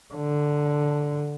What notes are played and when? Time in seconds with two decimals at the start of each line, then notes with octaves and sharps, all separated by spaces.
0.14 D3